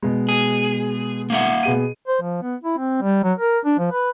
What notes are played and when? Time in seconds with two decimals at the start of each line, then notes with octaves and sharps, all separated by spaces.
0.03 B2 G#3
0.29 G#4
1.30 A#3 E5 F#5
1.63 B2 G#4 D#7
2.08 C5
2.21 F3
2.42 B3
2.64 E4
2.78 C4
3.02 G3
3.24 F#3
3.39 A#4
3.65 D4
3.79 F3
3.92 B4